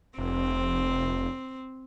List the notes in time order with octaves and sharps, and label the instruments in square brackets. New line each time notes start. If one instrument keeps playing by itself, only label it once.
[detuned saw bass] F1 [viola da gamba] C4